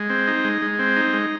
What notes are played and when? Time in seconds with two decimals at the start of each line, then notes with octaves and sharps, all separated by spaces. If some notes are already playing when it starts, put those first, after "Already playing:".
Already playing: G#3
0.10 C4
0.27 D#4
0.45 G#3
0.62 G#3
0.79 C4
0.96 D#4
1.13 G#3